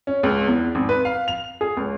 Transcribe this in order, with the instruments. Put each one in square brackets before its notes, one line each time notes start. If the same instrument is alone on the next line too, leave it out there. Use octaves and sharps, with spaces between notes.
[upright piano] C#4
C#2
E2
G#1
B4
F5
F7
G#4
C#2